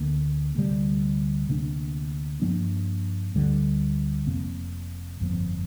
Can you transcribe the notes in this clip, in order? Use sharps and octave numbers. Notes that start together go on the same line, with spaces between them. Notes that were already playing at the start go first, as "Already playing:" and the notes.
Already playing: D2 D3 A#3
D2 C3 G3
D2 C3 A#3 D4
G2 F3 A#3 D4
D2 D3 G3
F1 F2 C3 A#3
G1 F2 F3 A#3